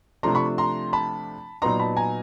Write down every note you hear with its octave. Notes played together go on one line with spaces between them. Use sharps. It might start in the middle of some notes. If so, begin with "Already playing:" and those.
C3 F3 A3 D4 A#5 C6
B5 C#6
A#5 C6
A5 B5
A#2 F#3 B3 D#4 A#5 C6
A5 B5
G#5 A#5